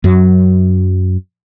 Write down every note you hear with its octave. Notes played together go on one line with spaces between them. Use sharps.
F#2 F#3